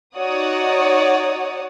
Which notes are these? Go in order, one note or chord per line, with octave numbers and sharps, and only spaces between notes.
D#4 F#4 C#5 D5 F#5 D#6